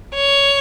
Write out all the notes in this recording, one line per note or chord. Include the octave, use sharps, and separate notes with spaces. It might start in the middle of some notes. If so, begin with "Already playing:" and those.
C#5